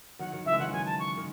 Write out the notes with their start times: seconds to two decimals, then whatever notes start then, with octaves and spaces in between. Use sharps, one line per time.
0.19 D#3 F#3 F#5
0.32 D#3 F#3
0.45 C#3 E3 E5
0.53 G#3
0.59 D#3 F#3 F#5
0.73 D#3 F#3 G#5
0.86 A5
0.99 C#6
1.17 D#3